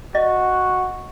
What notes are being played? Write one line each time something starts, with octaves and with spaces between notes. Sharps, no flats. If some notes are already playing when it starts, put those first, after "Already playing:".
F#4 D#5